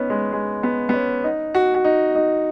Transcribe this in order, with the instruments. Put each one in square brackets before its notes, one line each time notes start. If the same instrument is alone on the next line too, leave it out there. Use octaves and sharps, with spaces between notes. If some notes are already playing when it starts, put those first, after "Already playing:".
Already playing: [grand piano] B3 C#4 D#4
G#3
G#3
B3
B3
C#4
D#4
F#4
F#4
D#4
D#4